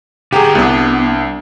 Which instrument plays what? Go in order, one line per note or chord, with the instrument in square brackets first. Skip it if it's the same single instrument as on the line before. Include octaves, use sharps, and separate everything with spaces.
[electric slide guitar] D3 F#5 A#5 [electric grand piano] G4 G#4
[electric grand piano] C2 D4 [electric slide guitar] B3